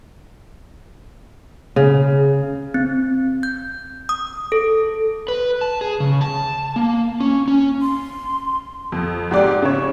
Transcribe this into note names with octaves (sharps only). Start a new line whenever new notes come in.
C#3
C4
G6
D#6
A4
B4
A5
G#4
C#3
A5
A#3
C#4
C#4
C6
F2
G#2 G4 D5
C#3 C#5